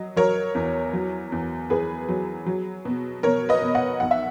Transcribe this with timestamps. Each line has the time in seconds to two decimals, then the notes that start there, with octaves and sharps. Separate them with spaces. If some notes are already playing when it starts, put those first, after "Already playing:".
Already playing: F#3 D#5
0.16 F#3 A#4 C#5
0.55 E2
0.93 F#3
1.32 E2
1.70 E2 G#4 B4
2.08 F#3
2.46 F#3
2.85 B2
3.23 B2 A#4 C#5
3.49 B4 D#5
3.62 B2
3.75 D#5 F#5
4.00 B1 F#5
4.11 E5